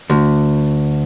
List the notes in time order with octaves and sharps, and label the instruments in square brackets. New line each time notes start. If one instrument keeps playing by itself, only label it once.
[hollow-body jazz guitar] D2